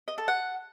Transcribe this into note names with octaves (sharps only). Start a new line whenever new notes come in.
D#5
A4
F#5